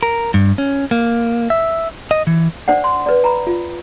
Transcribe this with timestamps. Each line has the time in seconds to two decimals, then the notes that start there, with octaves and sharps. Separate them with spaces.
0.03 A#4
0.34 G2
0.58 C#4
0.91 A#3
1.50 E5
2.11 D#5
2.27 E3
2.68 D4 C5 D5 F#5
2.84 C6
3.06 B4 D5
3.24 A#5 B5
3.47 F4